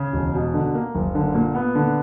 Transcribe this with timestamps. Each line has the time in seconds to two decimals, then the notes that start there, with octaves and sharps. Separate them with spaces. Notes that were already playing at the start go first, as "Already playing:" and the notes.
Already playing: C#3
0.13 E1
0.34 B2
0.54 D3
0.74 A#3
0.95 F#1
1.15 D3
1.35 A#2
1.55 B3
1.75 D3